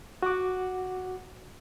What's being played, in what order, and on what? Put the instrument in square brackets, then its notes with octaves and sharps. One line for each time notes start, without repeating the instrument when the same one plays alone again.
[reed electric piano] F#4 F#5 D6